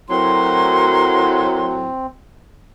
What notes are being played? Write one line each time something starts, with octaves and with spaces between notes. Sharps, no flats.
A2 F#3 C4 A#4 C6